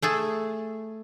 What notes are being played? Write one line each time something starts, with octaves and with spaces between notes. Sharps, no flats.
A3 G#4 A4